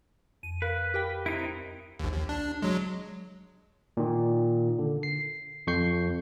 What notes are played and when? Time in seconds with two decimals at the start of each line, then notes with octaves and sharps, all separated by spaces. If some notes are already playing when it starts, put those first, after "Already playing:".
0.43 F2 D#7
0.62 A#4 B4 F5
0.94 G4 A#4 G5
1.26 C4 D#4 E4 D7
1.99 A#1 D#2
2.12 D#2
2.29 D4
2.62 F#3 G#3
3.97 A#2 D#3
4.79 D3
5.03 C7
5.67 F2 C#6 G6 C7